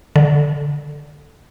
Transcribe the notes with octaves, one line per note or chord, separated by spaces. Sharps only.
D3